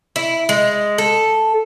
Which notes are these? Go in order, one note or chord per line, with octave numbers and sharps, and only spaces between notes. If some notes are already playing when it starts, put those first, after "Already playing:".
E4
G#3
A4